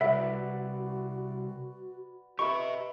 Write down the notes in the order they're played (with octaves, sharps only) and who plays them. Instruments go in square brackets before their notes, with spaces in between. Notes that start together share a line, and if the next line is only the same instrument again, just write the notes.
[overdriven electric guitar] C2 [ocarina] F#4 [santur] B4 D5 F#5 [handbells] E5
[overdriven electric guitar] G4 E5 [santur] B4 D#5 [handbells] C#6